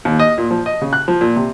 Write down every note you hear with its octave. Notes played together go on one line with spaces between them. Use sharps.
D#2
D#5
A#2
F3
D#5
C#3
F#6
F3
A#2
C3